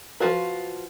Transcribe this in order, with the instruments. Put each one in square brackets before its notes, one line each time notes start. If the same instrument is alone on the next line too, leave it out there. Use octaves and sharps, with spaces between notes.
[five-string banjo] F3 G#3 F4 F#4 B4